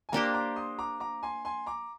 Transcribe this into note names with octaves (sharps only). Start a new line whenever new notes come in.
G#5
A#3 D4 G4 C5 G5 A#5
A#5 D6
C6 D#6
A#5 D6
A#5 D6
G#5 C6
G#5 C6
A#5 D6